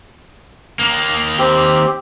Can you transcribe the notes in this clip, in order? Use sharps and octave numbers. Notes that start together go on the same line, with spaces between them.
D#3 A#3
C4 G4